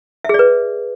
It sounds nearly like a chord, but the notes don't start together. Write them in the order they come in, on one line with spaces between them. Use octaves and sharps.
E5 G#4 D5 B4